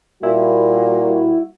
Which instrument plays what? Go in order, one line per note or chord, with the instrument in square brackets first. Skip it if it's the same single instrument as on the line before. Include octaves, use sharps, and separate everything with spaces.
[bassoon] A#2 [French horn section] G3 A#3 F#4 [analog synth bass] E4